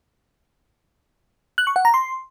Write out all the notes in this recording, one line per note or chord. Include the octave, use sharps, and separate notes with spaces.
F#6
C#6
F#5
A#5
C6